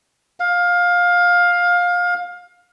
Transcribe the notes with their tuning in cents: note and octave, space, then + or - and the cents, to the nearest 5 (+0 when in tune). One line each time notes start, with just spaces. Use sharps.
F5 +20